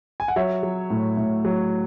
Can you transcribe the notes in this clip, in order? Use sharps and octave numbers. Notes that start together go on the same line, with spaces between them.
G#5
F#5
F#3 C#5 E5
F#3
A2
A2
F#3